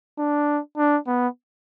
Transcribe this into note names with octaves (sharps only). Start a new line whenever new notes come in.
D4
D4
B3